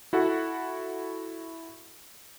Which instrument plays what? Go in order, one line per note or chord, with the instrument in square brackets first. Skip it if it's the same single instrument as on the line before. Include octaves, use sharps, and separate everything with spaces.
[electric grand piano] E4 F#4 A4 F#5